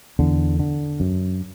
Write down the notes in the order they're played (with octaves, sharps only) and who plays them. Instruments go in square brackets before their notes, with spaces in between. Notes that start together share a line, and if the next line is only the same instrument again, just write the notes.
[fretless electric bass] E2 D3
D3
F#2